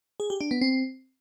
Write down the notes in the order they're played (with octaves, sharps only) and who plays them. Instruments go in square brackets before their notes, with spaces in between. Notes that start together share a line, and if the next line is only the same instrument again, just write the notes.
[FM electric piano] G#4
G4
D4
B3
C4